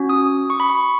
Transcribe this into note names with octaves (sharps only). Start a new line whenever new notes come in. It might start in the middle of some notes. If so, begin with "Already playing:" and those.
Already playing: C#4 F#4
D#6
C#6
B5
C#6